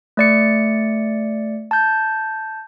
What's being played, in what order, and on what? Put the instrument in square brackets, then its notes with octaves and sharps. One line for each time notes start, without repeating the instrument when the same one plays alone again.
[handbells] A3 D5 C#7
A5 G6